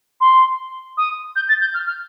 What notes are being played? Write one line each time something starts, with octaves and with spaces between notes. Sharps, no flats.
C6
D#6
G6
A6
G6
F6
F6